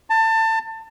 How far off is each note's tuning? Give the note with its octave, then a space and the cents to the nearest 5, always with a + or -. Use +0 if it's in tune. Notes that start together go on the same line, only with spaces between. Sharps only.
A5 +25